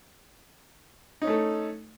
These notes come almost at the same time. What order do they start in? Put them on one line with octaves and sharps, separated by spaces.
D#4 C#4 A3 A4